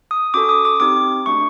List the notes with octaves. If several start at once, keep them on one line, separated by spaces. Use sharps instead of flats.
D#6
C#4 F#4 A4 D6
D#6
D6
C4 D#4 G4 D6
A3 D4 F#4 C#6